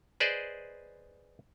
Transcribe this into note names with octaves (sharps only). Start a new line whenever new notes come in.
G#4 B4 C5 D5 D#5